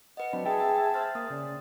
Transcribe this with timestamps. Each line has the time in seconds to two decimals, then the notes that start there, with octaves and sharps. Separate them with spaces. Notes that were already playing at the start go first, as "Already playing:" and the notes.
0.17 B4 D#5 F#5
0.33 F#3 C4 D4 B5
0.45 G#4 E5 G5 A5
0.94 C5 C6 F6 A6
1.15 A#3 D#6
1.30 C#3 D5